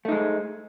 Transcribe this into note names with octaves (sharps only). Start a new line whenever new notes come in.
G#3 A3 D#4